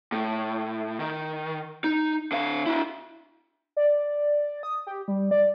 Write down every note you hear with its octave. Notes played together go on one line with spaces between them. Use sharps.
A2
D#3
D#4
D3 F5
D4 E4
D5
D#6
G4
G3
D5